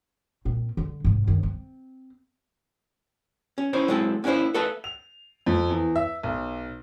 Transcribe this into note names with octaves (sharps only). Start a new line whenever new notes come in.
A#2 C4
D3
G#2 C3
G2 D#3
C4
C#4
C#4 D#4 E4 C5
F#3 G#3 C4 E4 A4
A#3 C#4 D4 E4 C5
A4 B4 D#5 E5 A5
F7
F2
E2
E5
B1